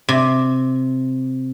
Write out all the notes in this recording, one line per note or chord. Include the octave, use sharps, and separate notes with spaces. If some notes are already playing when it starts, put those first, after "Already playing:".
C3